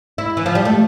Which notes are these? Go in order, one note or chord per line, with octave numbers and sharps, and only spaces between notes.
E4
E3
F3
G3
A3